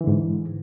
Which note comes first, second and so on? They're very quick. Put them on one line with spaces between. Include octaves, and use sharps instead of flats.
E3 D3 G#2